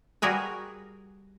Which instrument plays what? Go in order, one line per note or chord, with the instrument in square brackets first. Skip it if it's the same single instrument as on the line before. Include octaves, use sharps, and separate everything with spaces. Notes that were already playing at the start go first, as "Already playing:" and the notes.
[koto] G3 F#4 G#4 A#4 B4